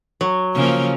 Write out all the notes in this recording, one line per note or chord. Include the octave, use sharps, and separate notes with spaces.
F#3
C#3 F3 A#3